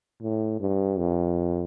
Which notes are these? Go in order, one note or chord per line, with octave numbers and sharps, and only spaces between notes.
A2
G2
F2